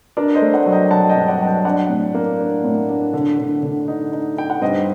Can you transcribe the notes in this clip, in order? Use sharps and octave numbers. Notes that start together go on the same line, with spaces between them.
D4 A#4 D5
C5 D#5
A3
D5 F#5
F#3
D#5 G5
F#3 F#5 A5
D#5 G5
G2
D5 F#5
F#3 A5
D#5 G5
D4 D5 F#5
A2
A#3
D4
A2
D4
D3
D3
D3
D#4
D#4
D#4 G5
F#5
G2 C5 D#5